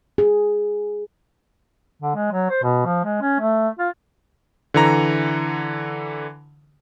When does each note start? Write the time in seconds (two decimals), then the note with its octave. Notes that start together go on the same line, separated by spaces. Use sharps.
0.18 G#4
2.02 D3
2.16 G#3
2.32 F#3
2.50 C5
2.63 B2
2.86 F3
3.04 G#3
3.22 C#4
3.40 A3
3.79 F4
4.74 D3 E3 A#5